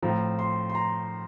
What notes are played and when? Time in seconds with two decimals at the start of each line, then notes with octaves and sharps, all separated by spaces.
0.02 A2 F3 C4 A#5
0.39 C6
0.70 C6
0.75 A#5